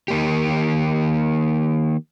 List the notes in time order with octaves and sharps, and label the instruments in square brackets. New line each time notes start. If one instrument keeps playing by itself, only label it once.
[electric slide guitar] D#3 A#3 G4